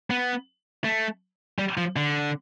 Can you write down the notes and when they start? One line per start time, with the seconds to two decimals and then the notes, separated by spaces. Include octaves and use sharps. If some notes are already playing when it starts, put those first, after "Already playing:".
0.10 B3
0.84 A3
1.59 G3
1.77 F3
1.96 D3